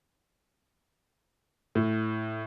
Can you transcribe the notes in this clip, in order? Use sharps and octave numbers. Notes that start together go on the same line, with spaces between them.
A2